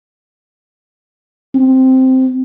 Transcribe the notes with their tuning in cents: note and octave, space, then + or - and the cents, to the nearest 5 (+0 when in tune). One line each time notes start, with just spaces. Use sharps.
C4 -5